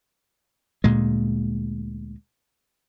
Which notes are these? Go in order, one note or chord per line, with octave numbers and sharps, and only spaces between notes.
D2 A#2 G#3